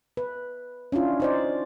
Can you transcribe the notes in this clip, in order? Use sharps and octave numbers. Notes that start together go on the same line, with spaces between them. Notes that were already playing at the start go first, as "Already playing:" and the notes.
B4
C#4 D4 E4 F4
D#4 C5 D5